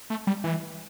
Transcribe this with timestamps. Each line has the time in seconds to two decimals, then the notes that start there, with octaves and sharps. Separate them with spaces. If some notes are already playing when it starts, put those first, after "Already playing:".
0.10 A3
0.27 G3
0.44 E3